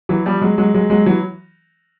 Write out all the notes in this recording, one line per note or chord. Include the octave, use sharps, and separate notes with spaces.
E3 F#3
F3 G3
F#3 G#3
F#3 G#3
F#3 G#3
F#3 G#3
E3 F#3